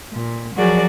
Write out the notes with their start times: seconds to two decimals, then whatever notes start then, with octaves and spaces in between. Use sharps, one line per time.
0.13 A#2
0.54 F3 F#3 F#4 G#4 A#4 D5